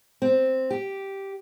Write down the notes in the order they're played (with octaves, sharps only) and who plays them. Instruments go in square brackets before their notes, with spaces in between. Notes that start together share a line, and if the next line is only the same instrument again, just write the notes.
[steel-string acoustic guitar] C4
G4